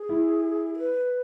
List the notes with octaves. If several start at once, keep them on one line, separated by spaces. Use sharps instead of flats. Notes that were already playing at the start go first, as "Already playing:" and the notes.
Already playing: G#4
E4
G#4
B4